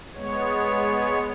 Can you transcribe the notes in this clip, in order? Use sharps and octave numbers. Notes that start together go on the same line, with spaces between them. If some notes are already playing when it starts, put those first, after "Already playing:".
G#3 B3 C#5